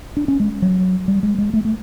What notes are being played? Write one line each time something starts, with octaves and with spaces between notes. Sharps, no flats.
D4
C#4
G#3
F#3
G3
G#3
G#3
A3
A3